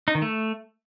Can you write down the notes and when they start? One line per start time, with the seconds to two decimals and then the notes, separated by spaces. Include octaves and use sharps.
0.08 D#4
0.15 D#3
0.22 A3